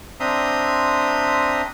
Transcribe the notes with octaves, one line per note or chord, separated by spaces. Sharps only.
C4 D4 E5 A#5 C6 D#6